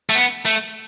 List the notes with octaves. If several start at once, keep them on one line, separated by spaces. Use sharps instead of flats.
A3
B3
A3